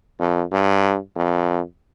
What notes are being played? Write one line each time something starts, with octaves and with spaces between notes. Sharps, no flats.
F2
G2
F2